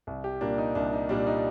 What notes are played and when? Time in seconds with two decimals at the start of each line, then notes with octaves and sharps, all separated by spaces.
0.07 C2
0.24 G4
0.41 A#2 G3 A#3 D4
0.58 D#4
0.75 C2 D4
0.93 D#4
1.09 A#2 G3 A#3 D4
1.27 D#4